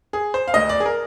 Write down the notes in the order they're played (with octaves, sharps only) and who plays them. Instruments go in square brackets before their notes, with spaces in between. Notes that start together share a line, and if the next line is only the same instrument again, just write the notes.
[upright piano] G#4
C5
F5
D2 D3 D#5
D5
G#4
A#4